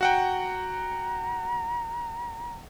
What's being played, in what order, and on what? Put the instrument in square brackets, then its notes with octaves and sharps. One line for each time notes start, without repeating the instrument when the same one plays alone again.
[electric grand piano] F#4 F#5 G5 [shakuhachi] A#5